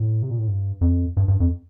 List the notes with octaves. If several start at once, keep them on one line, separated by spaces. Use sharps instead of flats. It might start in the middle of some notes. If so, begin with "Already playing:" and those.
Already playing: A2
C3
A#2
A2
G2
F2
G2
G2
F2